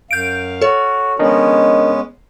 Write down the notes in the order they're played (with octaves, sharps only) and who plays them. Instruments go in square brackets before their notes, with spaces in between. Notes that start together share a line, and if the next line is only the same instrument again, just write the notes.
[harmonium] F#2 F5 [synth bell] G6 D7
[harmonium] F#4 [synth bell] A4 C#5
[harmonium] G#3 B3 C#4 [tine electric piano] D4 A#4 D#5